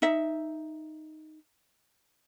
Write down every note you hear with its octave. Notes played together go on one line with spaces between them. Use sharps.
D#4 E5